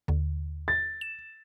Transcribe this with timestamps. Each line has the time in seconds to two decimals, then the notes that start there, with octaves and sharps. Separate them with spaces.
0.08 D#2 D3
0.68 A6
1.01 E7